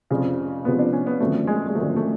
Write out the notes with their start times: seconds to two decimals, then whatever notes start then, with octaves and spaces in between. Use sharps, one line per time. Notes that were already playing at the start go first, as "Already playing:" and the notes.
0.10 F1 F2 C#3 F3
0.65 F1 F2 C#3 F3 B3
0.79 D4
0.93 C#4
1.07 B3
1.20 G#1 F#2 D3 F3 A3
1.47 G#3
1.67 G#3
1.75 G#1 F#2 D3 F3 A3
1.96 A3